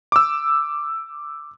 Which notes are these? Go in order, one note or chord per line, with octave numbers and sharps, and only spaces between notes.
D6 E6